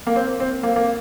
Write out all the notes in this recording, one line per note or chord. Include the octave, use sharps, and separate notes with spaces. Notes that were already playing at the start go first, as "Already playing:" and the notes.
A#3
C4
C4
A#3
A#3